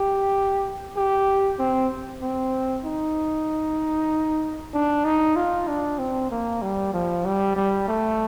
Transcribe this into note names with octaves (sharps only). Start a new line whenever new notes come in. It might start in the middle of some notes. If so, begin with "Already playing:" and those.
Already playing: G4
G4
C4
C4
D#4
D4
D#4
F4
D4
C4
A#3
G3
F3
G3
G3
A3